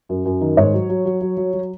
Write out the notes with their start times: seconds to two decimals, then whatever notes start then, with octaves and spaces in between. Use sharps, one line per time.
0.09 F#2
0.25 F#2
0.41 D#3
0.57 G#2 C#5
0.73 F#3
0.89 F#3
1.05 F#3
1.21 F#3
1.37 F#3
1.53 F#3